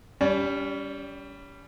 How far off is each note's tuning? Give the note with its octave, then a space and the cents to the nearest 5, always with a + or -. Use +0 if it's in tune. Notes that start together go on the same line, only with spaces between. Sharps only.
G3 +0 C#4 +35